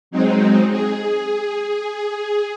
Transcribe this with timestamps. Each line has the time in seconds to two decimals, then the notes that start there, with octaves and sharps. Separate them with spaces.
0.11 F#3 G#3 C4 D#4
0.70 G#4